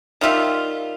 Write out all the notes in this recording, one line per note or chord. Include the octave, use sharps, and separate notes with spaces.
D#3 G3 F4 E5